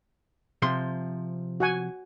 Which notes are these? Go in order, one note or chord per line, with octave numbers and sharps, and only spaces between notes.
C3 F3 C6
F#4 F#5 G#5